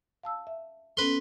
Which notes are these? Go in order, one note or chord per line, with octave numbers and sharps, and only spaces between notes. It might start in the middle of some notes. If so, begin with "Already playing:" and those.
F5 A5 E6
E5
B3 C#4 A4 B4 C6